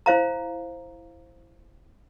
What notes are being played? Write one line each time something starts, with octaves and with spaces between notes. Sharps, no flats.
E4 C5 F5 A#5